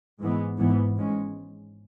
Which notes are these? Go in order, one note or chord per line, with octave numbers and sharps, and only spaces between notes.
G#2 E3 G#3 B3
G#1 G#2 E3 B3
G#2 G#3 C#4